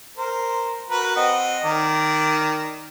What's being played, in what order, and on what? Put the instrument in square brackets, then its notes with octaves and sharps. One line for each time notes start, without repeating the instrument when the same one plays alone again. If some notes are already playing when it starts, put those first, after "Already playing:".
[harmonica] A#4 C5
F#4 A#4 B4
C4 D#5 F#5
D#3 A#4 D5